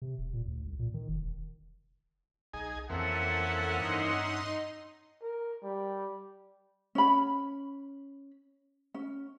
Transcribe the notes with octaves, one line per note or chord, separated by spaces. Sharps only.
C3
D#1
A#2
D2
C2
A#2
D#3
F1
E1
B1 D#4 G#4 G#5
F2 E3 A#3 C4 C#4 A4 E5 F#5
G2 D#4 D#5 C6
A#4
G3
C#4 B5
C#4